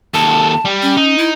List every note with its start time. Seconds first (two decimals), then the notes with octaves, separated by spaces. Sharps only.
0.14 D#2 A4 A5
0.65 G3
0.82 C#4
0.97 D#4
1.18 E4